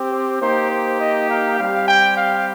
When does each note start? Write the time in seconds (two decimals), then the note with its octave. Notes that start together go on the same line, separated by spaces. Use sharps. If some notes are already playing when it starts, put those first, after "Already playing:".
Already playing: C4 G4
0.12 C5
0.41 A#3 D#4 G4 C5
0.70 C5
1.00 D#5
1.29 F5
1.59 G3 C4 G4 F5
1.88 G5
2.17 F5